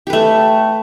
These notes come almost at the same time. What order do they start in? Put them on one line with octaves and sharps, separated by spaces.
G4 B4 A3